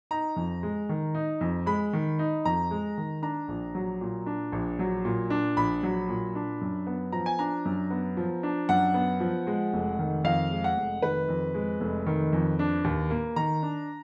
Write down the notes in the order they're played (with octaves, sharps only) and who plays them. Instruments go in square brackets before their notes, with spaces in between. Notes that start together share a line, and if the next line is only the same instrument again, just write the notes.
[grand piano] D#4 A#5
F2
G#3
D#3
D#4
F2
G#3 B5
D#3
D#4
F2 A#5
G#3
D#3
D4 A#5
A#1
F#3
A#2
D4
A#1
F#3
A#2
D4
A#1 B5
F#3
A#2
D4
F#2
B3
F3 A#5
G#5
D4 A#5
F#2
B3
F3
D4
F#2 F#5
B3
F3
G#3
F1
D#3
F2 F5
G#3
F#5
F1
D#3 B4
F2
G#3
F1
D#3
F2
D4
D#2
A#3
D#3 A#5
D4